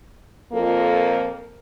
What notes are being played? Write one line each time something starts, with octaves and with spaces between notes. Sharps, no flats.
F2 A#2 A#3 A4 A#4